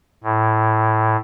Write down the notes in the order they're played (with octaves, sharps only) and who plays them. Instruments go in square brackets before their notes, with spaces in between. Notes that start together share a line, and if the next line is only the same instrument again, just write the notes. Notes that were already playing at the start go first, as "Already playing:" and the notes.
[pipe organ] A2